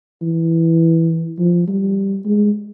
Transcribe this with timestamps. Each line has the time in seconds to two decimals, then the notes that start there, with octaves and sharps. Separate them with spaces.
0.22 E3
1.38 F3
1.67 G3
2.25 G#3